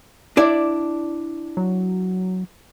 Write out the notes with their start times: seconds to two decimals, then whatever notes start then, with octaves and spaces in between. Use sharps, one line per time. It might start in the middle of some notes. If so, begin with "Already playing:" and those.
0.37 D4 E4 D5
1.57 F#3